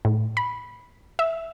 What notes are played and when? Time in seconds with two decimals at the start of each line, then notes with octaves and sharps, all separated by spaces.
0.05 A2
0.37 B5
1.19 E5